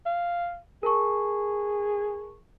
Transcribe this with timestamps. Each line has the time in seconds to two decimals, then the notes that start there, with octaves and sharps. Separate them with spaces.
0.06 F5
0.83 G#4 A#4 A5 C#6